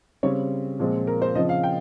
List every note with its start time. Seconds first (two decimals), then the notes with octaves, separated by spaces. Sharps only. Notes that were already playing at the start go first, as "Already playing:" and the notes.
0.23 C#3 G3 C4 C#5
0.79 A#2 F3 G#3 C4
1.07 A#4
1.22 C5
1.35 C#3 F3 C4 D#5
1.49 F5
1.63 G5